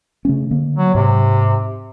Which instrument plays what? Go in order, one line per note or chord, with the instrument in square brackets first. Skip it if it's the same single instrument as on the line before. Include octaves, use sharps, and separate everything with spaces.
[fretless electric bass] C#3 A3 C#4
D3 A#3
[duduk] F#3
[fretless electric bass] G#2 [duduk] C3